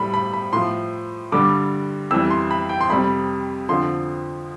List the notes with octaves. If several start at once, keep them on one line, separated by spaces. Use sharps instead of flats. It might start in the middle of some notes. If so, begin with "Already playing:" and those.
Already playing: A2 G3 B5
B5
B5
A2 F3 C6
G2 D3 G3 D6
F2 E3 G3 E6
C6
B5
G5
C6
F2 C3 G3 B5
F2 D3 F3 C6